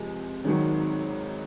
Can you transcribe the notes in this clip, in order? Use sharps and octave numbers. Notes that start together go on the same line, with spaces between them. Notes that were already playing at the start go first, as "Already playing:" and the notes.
Already playing: C#2 C3 F3 G#3
G#1 G#2 D#3 F#3